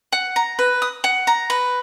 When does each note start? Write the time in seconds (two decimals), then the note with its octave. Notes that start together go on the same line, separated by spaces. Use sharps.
0.12 F#5
0.36 A#5
0.59 B4
0.82 D#6
1.04 F#5
1.27 A#5
1.50 B4